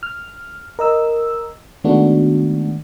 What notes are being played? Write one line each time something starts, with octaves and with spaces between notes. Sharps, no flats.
F6
A#4 D#5 E6
D#3 G#3 A3 B3 D4 F#4